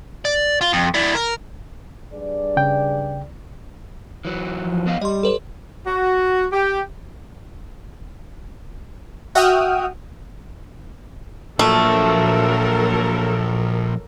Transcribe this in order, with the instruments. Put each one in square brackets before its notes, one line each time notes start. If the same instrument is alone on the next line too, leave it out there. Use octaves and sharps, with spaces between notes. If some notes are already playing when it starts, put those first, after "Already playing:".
[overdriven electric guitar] D5
F4
F2
E4 D5
A#4
[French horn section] G2 G#4 D5
[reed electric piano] C#3 G5
[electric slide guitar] E3 F#3
[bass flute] F3
[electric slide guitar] B3 D#5 F5
[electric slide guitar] G3 [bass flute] G4 [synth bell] D#5 C6
[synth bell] A4 B4 C#5
[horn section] F#4
G4
[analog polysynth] F#4 E5 F#5 G5 D#6 F6
[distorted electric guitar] A#2 F3 [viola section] F#3 A4 A#4 [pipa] A3